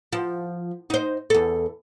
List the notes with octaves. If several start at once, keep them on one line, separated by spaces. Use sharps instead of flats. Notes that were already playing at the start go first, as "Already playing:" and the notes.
F3
D#4 C5
E2 A4